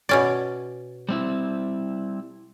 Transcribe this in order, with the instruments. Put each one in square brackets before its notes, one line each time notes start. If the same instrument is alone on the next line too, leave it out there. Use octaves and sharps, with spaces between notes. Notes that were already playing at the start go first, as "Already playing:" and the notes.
[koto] B2 C#4 D5
[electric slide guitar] G3 C4 E4